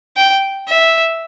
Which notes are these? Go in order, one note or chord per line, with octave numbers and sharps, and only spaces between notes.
G5
E5